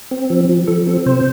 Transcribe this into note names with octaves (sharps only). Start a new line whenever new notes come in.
C4
F3
F3
F3 A4
C4 A4
C3 C5